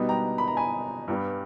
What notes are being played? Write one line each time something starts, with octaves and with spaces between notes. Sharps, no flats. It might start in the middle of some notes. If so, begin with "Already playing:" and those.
Already playing: B2 G3 B3 D#4
G5 A#5
B5
A#5
G#5 B5
G2 G3 B3